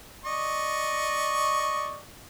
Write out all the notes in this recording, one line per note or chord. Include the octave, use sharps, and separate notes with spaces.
D5 D#5 C#6